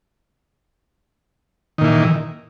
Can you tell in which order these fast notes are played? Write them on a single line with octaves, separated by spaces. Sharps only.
D#3 A#2 E3